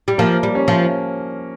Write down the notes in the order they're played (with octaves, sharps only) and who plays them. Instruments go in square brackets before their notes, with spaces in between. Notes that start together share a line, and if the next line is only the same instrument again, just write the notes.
[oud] G3
[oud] F3 [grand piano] A#3
[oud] G3
[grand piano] C#4
[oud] F3